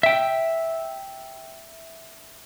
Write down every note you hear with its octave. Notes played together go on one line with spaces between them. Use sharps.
E5 G5